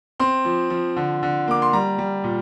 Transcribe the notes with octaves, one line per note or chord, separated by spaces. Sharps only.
C4 C6
F3
F3
D3
D3
A#3 D6
C6
G3 A#5
G3
A#2